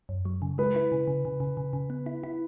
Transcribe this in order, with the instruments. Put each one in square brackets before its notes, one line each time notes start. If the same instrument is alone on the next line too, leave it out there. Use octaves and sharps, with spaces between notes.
[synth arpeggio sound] F#2
F#3
C#3
[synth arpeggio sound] G#3 [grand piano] B4
[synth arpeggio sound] E4
C#3
C#3
C#3
C#3
C#3
C#3
B3
E4
E4